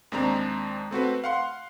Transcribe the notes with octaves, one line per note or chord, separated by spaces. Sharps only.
D#2 G#3 C4 D4 A#5
A3 C4 F#4 B4
F5 F#5 C6